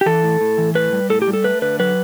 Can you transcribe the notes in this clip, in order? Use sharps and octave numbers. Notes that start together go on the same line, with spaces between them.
G4
E3 A4
A2
A2
E3
A2 B4
G3
A2 A4
G4
G3
A4
A3 B4
D3 B4
F#3 B4